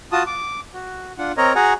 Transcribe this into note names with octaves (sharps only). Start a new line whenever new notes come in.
F4 F#4 A5 D#6
D6
F#4
D4 F4 F#5
C4 A#4 C#5 D#5 A#5
F#4 G#4 F#5 G#5 A#5